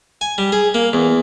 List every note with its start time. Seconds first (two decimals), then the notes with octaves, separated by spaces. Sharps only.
0.21 G#5
0.38 G3
0.52 G#4
0.74 A#3
0.93 E2